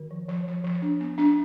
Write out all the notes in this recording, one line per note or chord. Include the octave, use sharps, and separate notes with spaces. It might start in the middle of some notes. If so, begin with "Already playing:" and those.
Already playing: D#3
F3
F3
F3
F3
D4
B3
D4